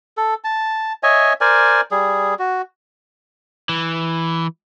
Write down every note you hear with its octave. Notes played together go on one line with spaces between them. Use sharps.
A4
A5
C#5 D#5 E5 G#5
A#4 C5 D5 G#5
G3 G#4
F#4
E3